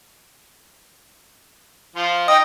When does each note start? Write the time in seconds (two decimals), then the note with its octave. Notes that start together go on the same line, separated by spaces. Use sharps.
1.96 F3 F4
2.28 D#4 D#5 G5 D#6